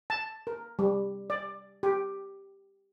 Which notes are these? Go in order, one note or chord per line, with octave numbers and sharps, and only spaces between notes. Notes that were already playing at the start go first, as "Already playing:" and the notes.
A5
A#4
G3
D5
G4